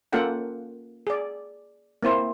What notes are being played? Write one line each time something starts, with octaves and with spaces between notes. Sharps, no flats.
A#3 C#4 F4 A4 F#5 G5
G#4 D5
A#3 C4 E4 C5